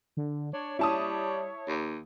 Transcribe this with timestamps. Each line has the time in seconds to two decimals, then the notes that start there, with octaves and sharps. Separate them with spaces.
0.17 D3
0.53 D4 C#5
0.79 G3 E4 A5 D#6
1.68 D#2